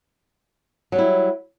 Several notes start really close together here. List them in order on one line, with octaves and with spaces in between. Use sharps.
F#3 G3 E4